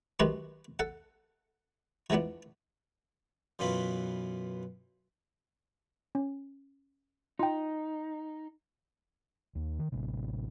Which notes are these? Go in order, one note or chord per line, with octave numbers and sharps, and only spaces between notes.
F#2 D#3 G#3 G4 B4 C6
A4 F#5
E3 F3 G#3 B3 D4
F#2 B2 E3 F4 B5
C#4
D#4 F4 G5
D#2
D#3
A1 C3